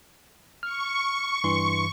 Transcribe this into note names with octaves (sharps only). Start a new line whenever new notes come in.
C#6 F6
G2 E3 C6